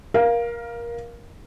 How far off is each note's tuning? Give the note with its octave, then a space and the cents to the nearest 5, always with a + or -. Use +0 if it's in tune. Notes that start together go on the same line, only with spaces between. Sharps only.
A#4 +20 F5 +0